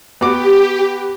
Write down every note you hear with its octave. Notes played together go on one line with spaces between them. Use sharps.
B3 F#4 G4 D6